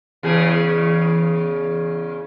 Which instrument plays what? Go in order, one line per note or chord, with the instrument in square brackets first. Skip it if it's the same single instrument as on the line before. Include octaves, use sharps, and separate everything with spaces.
[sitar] E2 C#3 G#4